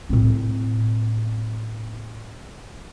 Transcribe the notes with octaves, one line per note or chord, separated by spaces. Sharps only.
A2 C4